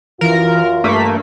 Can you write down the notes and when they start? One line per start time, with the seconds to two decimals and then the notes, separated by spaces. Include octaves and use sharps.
0.21 F#2 E3 F4 A#4
0.84 G2 A3 A#3 B6